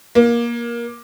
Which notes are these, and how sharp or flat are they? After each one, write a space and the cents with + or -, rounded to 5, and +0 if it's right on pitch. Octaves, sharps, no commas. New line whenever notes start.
A#3 +20